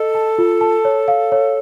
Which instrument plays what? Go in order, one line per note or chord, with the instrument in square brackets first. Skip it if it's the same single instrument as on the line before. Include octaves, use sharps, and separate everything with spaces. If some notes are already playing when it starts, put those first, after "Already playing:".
Already playing: [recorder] A4 [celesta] D#5
[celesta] A5
F4
A5
C#5
F5
C#5